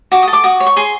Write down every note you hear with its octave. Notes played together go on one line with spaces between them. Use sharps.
F#4 D6
A4 D#6
D6
F#4 D#6
C#5
C#6
G#4 C6